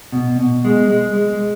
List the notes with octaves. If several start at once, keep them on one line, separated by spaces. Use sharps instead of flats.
B2
B2
G#3
G#3
G#3